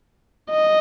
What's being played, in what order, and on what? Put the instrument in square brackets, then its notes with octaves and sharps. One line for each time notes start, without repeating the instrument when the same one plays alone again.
[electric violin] D#5